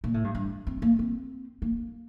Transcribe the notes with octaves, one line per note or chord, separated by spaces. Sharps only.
A#2
A2
G2
G2
C4
A#3
C4
A#3